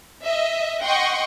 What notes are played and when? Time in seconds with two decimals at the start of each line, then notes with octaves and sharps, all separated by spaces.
0.24 D#5 E5
0.84 D#5 F#5 G5 C6 C#6